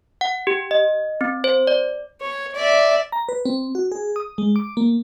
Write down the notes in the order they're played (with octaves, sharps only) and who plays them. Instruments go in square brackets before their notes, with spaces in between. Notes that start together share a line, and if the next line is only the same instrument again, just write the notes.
[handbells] F#5
G4
D#5
C4
C5
D5
[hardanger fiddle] C#5
D5 E5
[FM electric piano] A#5
B4
C4
F#4
G#4
D#6
G#3
D6
A#3